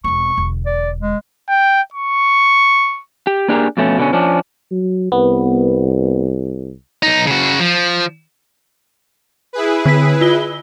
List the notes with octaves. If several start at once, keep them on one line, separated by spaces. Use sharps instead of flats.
E1 C4 C#6
E1 D3
D5
G#3
G5
C#6
G4
A#3 D4 G4 G#4 A#4
F2 B2 A3 C#4
B2 D3 A#3 C#4
F3 C#4 D4
F#3
C2 B3
B1 D#4
C#3 F#4
F3
E4 G#4 B4
D3 B6
F4 G7